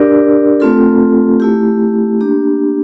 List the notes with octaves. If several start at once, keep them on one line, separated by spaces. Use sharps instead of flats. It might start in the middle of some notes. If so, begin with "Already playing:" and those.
Already playing: D4 G4 A#4 D5
A3 C4 F4 A4
A3 E4 G4
A#3 D4 G4